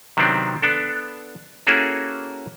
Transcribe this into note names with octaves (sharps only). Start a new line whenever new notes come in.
C3 D#3 F#3 B3 C4 D4
B3 D4 A4
A#3 C#4 E4 F#4 G#4 A4